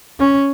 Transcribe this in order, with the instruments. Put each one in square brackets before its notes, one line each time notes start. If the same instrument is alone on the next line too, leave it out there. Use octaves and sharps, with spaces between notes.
[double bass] C#4